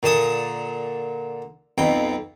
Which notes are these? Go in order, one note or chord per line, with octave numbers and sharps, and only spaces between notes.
A#2 D3 A5 D#6
B1 F2 G5